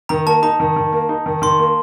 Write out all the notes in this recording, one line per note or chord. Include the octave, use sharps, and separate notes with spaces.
D#3 A#5
A#3 A5
D#4 A#5
D#3
D#3
A#3
D#4
D#3
D#3 C6
A#3